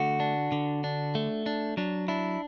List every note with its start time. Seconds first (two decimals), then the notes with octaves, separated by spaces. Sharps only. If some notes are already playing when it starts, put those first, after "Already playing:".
Already playing: D3 A3 F#4
0.20 D4
0.52 D3
0.84 D4
1.15 A3
1.46 D4
1.77 F#3 D4
2.08 D4 E4